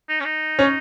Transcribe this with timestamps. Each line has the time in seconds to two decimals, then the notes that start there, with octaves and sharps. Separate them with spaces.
0.09 D#4
0.20 C#4
0.25 D#4
0.59 C#4